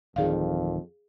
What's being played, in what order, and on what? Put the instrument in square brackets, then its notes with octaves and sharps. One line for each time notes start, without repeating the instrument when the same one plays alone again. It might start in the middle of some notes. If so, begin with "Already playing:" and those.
[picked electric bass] D1 D#3 [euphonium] F2 [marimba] G#4 D5 F5